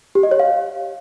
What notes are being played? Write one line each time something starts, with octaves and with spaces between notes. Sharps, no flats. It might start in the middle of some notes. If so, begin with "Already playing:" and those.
G4
D#5
C#5
F5